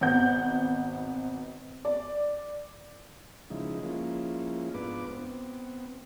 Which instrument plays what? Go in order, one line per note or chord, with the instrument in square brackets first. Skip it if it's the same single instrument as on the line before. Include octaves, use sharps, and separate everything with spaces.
[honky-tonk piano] G#1 B2 B3 F#5 G6
D5
[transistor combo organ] C#3 F3 G#3 D#4 E4
F3 G#3 A#3 C#4 E4 F4
G#2 B3 D4 F4 B4 D6
B3 C4